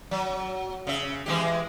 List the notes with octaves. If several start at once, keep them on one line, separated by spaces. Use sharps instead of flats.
F#3
C#3 E5
E3 G#3 G4